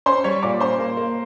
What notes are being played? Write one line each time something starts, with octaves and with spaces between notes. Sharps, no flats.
C#4 C5 C6
G3 C#5 C#6
A#2 D5 D6
C#4 C5 C6
A#3
A#3